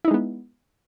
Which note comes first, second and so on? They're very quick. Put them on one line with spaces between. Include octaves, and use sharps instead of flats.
E4 D#4 G#3 B3